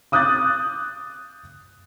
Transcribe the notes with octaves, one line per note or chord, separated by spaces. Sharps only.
D6 D#6 F#6 G6 A6